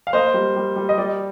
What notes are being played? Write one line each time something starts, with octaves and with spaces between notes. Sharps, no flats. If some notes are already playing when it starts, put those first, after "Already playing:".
F5
A#3 C5 D#5
G3
G3
G3
D#5
G3 D5